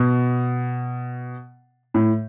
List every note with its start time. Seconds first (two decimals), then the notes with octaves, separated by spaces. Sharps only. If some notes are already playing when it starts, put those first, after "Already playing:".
Already playing: B2
1.94 A2